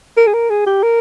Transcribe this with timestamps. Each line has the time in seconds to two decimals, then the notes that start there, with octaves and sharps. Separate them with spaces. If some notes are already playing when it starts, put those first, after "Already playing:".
0.17 A#4
0.27 G#4
0.34 A#4
0.50 G#4
0.67 G4
0.83 A#4